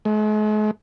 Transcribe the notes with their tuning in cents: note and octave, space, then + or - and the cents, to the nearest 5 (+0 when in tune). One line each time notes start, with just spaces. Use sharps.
G#3 +45